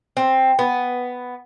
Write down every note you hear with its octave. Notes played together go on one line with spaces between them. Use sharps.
C4
B3